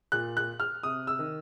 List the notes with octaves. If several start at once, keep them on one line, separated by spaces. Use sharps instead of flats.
A#2 F#6
F#6
F6
C3 D#6
E6
D#3